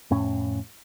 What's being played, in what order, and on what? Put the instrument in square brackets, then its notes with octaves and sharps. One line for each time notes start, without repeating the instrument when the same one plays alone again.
[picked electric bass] F2 A2 C#4